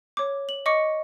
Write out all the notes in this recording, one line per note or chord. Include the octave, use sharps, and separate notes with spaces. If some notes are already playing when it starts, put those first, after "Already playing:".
C#5 D6
F#7
D#5 C#6 D6 C#7